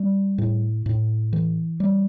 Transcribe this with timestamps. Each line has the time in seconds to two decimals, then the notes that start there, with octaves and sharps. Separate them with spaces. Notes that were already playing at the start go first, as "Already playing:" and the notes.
Already playing: G3
0.38 A2
0.86 A2
1.33 E3
1.80 G3